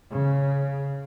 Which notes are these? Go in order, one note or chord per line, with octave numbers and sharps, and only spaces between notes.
C#3